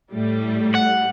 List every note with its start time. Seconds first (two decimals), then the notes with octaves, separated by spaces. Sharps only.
0.13 A2 G3 A3
0.75 F#5